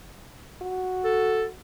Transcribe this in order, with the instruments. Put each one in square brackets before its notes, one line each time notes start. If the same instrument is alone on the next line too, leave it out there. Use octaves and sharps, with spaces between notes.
[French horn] F#4
[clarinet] A4